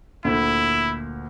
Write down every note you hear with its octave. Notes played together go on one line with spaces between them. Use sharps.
D2 A#2 D3 E4